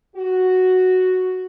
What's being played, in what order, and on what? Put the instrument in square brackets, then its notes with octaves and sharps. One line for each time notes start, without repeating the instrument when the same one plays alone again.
[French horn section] F#4